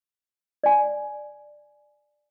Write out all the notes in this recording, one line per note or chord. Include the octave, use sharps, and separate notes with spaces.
D5 G#5